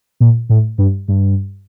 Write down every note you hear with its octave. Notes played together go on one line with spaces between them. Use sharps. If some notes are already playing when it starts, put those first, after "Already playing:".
A#2
A2
G2
G2